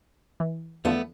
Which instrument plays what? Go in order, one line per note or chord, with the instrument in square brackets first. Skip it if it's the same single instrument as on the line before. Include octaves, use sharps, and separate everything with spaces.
[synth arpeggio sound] E3
[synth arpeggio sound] E2 D3 F3 [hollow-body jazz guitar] A3 B3